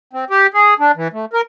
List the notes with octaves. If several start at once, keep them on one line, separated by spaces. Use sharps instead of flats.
C4
G4
G#4
D4
E3
A3
A#4